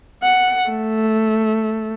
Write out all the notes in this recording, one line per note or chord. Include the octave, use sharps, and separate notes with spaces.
F#5
A3